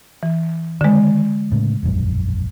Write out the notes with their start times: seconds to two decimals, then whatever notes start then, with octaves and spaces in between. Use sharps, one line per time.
0.23 E3
0.81 D3 D#3 G#3
1.52 A2 C#3
1.83 E1 A#1 F#2